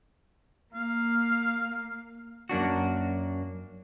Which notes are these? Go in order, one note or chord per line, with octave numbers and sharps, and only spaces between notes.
A#3 F5
F#2 A#3 D4 F#4